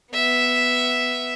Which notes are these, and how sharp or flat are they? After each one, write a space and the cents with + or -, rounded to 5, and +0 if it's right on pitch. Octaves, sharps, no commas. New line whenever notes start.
B3 +5 E5 +0